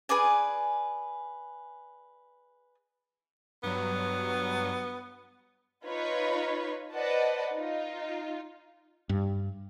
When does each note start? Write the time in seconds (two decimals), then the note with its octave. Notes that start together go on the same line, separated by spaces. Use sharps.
0.09 G#4 B4 D5 G#5
3.63 G2 F#3 B3
5.85 D#4 F4 B4 C#5 B5 C#6
6.92 B4 C5 D5 D#5 F#5 A5
7.55 D#4 F4
9.09 G2